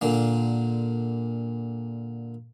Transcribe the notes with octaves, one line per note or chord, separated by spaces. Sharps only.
A#2 D3 A#3